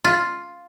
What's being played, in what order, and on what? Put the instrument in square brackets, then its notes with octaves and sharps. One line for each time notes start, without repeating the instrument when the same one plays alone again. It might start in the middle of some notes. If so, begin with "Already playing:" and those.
[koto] F4